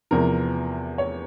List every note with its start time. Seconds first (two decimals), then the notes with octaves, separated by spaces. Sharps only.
0.11 E2 C3 F3 A#4
0.98 C#5